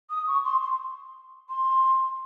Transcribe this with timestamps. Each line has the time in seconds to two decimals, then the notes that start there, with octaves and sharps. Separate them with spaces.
0.10 D#6
0.28 C#6
0.45 C6
0.62 C6
1.49 C6